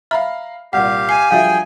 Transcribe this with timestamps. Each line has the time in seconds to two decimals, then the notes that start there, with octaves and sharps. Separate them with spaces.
0.11 E5 F5 A#5 B5 F6
0.73 C2 A#2 G4 F5 F#5
1.09 G#5 C7
1.31 G2 F3 F#3 G#4 E5 F5 G5